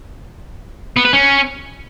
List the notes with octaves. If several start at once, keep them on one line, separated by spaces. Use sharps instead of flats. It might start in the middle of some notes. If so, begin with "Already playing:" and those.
B3
B4
C#4